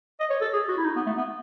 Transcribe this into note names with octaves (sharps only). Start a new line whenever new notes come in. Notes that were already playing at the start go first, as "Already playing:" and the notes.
D#5
C#5
A4
G#4
F#4
E4
D#4
B3
A3
B3